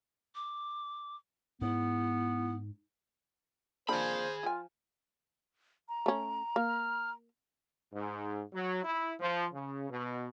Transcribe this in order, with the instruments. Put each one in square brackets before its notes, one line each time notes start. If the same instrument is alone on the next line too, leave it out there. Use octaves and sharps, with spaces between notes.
[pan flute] D6
[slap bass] G#2 [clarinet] B3 [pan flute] E4
[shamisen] F3 A#3 D4 [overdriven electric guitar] G#4 B5 [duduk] C5
[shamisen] F3 G#5 [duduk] F4
[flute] A#5
[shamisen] A3 C#4
[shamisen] A#3 [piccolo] F6
[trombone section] G#2
F#3
E4
F3
C#3
B2